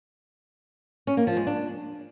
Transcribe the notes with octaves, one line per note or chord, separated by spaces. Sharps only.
C#4
A#3
F3
G#3
D4